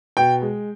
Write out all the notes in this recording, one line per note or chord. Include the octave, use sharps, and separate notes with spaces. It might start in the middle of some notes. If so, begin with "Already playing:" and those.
B2 G5
G#3